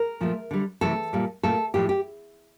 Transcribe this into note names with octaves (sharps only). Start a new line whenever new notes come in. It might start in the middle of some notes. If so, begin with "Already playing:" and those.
Already playing: A#4
A#2 F3 A3
D3 G3
C3 E3 A3 A4
A#2 G3
A#2 A3 A4
A2 F3 A3 G4
G4